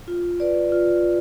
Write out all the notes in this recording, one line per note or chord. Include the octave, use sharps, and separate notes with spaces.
F4
B4 D5
F4
D5